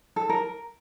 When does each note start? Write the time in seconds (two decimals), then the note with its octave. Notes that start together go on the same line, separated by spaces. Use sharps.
0.16 A4
0.29 A#4